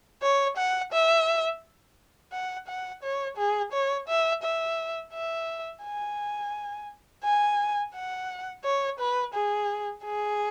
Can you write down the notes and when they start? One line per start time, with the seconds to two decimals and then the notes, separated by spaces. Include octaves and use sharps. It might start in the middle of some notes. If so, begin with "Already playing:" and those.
0.22 C#5
0.57 F#5
0.92 E5
2.32 F#5
2.67 F#5
3.03 C#5
3.37 G#4
3.72 C#5
4.08 E5
4.43 E5
5.13 E5
5.83 G#5
7.24 G#5
7.94 F#5
8.64 C#5
8.99 B4
9.34 G#4
10.04 G#4